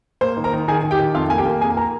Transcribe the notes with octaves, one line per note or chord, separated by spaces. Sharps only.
A#3 C5 C6
D#3
A#4 A#5
D#3
D#3 G#4 G#5
D#3
G4 G5
D#3
F2 F4 F5
A#3 G#5
G4 G5
A#3
F2 G#4 G#5
A#4 A#5